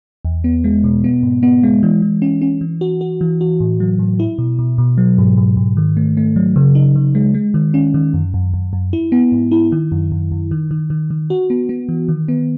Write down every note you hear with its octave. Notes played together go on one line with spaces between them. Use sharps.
E2
B3
G#3
B2
B3
G#2
B3
G#3
E3
E3
C#4
C#4
E3
F#4
F#4
E3
F#4
A2
F#3
A2
E4
B2
B2
B2
F#3
G#2
G#2
G#2
D#3
A3
A3
F#3
C#3
D#4
C#3
G#3
G#3
D#3
C#4
D#3
F#2
F#2
F#2
F#2
E4
B3
G#2
E4
D#3
F#2
F#2
F#2
D#3
D#3
D#3
D#3
F#4
B3
B3
E3
D#3
B3